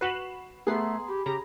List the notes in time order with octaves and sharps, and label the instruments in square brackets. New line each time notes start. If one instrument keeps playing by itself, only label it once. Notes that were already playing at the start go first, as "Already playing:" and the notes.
[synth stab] F#4 B4 [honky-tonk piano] C7 E7 F#7
[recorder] A3 [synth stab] B3 C7 [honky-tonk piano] G#4 [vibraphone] A#5 C6
[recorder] G4 [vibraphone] B5
[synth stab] C#3 A#5 [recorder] G4